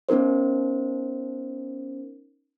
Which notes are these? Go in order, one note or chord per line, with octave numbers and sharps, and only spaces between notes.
B3 C#4 D#4 A#4 C5